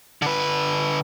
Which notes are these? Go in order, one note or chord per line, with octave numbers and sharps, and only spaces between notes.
D3 B4